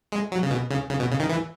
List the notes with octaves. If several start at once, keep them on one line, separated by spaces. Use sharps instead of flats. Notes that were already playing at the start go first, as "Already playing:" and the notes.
G#3
F#3
C#3
B2
C#3
C#3
B2
C#3
D#3
E3